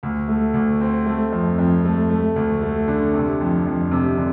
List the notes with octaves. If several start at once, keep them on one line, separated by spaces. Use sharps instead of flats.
D2
A3
D2
C4
A3
F2
F2
A3
A3
D2
A3
D3
C3
F2
F2
C3
D3